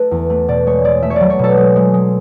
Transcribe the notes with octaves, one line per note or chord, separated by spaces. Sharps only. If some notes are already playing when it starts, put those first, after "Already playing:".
Already playing: A3 B4
E2
A3
B2 D5
G#3 C#5
G#3 D5
A3 E5
C#5
F#3 D5
C#5
B2 A4
G#3 A4
G#3
G#3